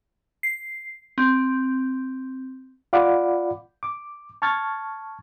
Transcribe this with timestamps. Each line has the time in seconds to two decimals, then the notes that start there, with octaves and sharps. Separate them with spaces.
0.43 C7
1.18 C4
2.93 F4 D5 F5 F#5 B5 D6
3.83 D6
4.42 A5 C#6 F6 G#6 A6